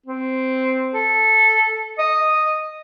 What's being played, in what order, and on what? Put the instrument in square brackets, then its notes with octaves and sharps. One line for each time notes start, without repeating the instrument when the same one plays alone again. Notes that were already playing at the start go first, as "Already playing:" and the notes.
[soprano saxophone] C4
A4
D#5